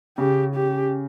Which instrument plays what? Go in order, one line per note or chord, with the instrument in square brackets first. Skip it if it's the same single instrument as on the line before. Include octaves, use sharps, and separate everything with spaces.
[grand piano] C#3 [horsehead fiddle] G4
[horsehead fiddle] G4